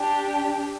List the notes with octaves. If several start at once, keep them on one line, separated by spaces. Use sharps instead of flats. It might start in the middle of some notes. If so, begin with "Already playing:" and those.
Already playing: D4 G4